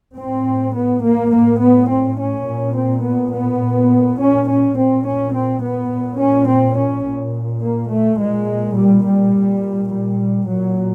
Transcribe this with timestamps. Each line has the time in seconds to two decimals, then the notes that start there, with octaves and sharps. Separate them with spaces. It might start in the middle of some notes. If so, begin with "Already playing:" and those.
0.16 A2 C4
0.74 B3
1.02 A#3
1.32 A2 A#3
1.60 B3
1.89 C4
2.18 C#4
2.46 A#2
2.74 C4
3.03 B3
3.33 B3
3.61 A#2
4.19 C#4
4.47 C#4
4.75 A#2 C4
5.04 C#4
5.33 C4
5.61 B3
5.90 A#2
6.19 C#4
6.47 C4
6.76 C#4
7.05 A#2
7.63 A#3
7.90 A3
8.20 A#2 G#3
8.77 G3
9.05 G3
9.34 A#2
9.91 G3
10.48 A#2 F#3